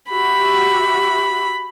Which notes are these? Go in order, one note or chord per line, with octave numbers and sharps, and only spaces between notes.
F#4 G4 E5 B5